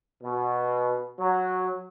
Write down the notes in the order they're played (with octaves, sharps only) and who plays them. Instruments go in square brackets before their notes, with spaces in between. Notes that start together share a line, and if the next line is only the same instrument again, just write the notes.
[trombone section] B2
F#3